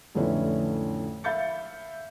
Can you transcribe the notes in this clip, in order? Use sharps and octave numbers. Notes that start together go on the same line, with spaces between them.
A1 F2 D3 C#4 E4 B4
E5 F5 B5 G6 A6 C#7